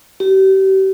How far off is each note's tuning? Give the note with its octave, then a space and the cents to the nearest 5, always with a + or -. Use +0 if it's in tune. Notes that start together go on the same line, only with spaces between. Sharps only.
G4 -35